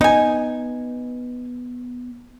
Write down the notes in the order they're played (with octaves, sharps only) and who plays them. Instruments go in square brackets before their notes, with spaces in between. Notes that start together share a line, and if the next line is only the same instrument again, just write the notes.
[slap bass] B3 [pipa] D#4 G#5